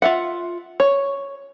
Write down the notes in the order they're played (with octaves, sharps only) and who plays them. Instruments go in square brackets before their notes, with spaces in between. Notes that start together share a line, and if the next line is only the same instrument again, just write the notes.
[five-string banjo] F4 E5 F#5
C#5